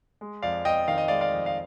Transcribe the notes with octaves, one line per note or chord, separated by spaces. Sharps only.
G#3
F2 D5 F5
F2 D#5 G5
D#3 F5
D#5
G#3 D5 F5
D5 F5
F2
F5